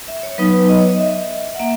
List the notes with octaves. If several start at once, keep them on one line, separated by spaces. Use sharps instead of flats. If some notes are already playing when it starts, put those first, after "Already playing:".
E5
C#5
F#3 B3 D#4 B4
B4
D#5
C#5
D#5
E5
F#5
A#3 E5